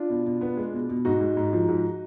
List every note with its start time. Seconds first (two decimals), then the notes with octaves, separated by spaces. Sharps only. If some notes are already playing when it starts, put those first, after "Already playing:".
Already playing: D4 F4
0.09 B2
0.26 B2
0.41 B3
0.57 G#3
0.73 B2
0.89 B2
1.05 G#2 D#4 F#4
1.21 G#2
1.37 G#2
1.53 F3
1.68 G#2